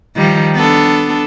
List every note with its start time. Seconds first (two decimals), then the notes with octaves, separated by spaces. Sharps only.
0.16 D#3 F3 G3
0.56 B3 D4 A4